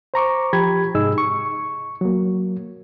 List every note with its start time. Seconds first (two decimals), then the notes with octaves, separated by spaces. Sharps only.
0.14 C5 A#5 C#6 D6
0.53 F3 G4 B5 G#6
0.95 G#2 C3 D#4 G#4 D#5 E6
1.18 C#6
2.01 F#3 A#3